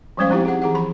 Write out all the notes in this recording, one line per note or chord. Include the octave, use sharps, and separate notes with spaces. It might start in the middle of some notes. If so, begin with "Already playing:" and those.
F3 G3 G#3 C#4 C5 F5
F3 C4 D#4 E4 G4
G#4 F#5
E3 G#4 F#5
F3 B5